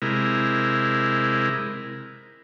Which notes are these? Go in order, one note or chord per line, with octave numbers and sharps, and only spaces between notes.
C3 G#3 E4 A#4